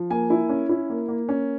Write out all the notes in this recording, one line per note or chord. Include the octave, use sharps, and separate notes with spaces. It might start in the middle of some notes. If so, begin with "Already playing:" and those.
Already playing: F3
A#3 G#5
E4
C#4
E4
A#3
A#3
C#4